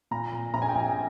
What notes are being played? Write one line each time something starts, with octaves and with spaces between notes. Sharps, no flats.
A#2 A#5
A#2
A#1 A#5
G#5
G5
A#1 G#5